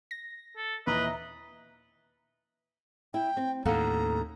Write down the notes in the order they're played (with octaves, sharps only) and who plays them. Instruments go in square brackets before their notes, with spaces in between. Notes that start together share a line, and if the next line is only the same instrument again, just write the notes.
[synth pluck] A#6
[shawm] A4
[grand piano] D#2 A#2 E3 [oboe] B4 [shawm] D#5 [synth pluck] E5 A#5
[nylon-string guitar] E4 [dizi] G5
[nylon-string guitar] C4
[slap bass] D#2 A2 [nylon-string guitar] A4 F5 F#5 [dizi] A#5